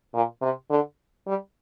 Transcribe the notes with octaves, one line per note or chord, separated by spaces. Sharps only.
A#2
C3
D3
G3